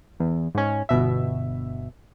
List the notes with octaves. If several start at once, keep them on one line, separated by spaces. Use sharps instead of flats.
E2
G#2 C#4
G1 B2 E5